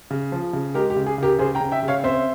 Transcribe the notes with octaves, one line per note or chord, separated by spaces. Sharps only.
C#3
F3
C#3
G#3 G4 A#4
G4
C#3
G#4
C#3 G4 A#4
C#3 G#4 C5
G5 A#5
C#3
E5 G5
C#3
C#5 F5
C4 C5 E5